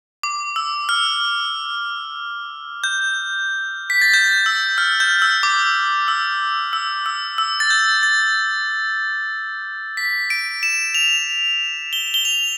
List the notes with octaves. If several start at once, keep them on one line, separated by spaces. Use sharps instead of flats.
D6
E6
F6
G6
B6
A6
G6
E6
F6
G6
E6
D6
E6
E6
E6
E6
A6
G6
A6
B6
D7
E7
F7
G7
G7
F7